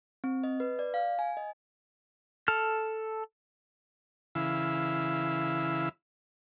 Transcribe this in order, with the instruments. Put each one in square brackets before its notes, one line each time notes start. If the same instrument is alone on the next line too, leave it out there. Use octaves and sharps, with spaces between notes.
[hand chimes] C4
D#5
B4
D5
F5
G#5
D#5
[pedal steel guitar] A4 F6
[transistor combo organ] C#3 E3 E4 F5 E6